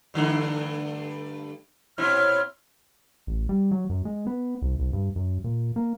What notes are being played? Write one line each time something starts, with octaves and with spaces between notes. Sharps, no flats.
G2 D3 A3
A#2 C4 E4 C#5 F6
A1
G3
F#3
F#2
G#3
B3
C2
C2
G2
F#2
A#2
A#3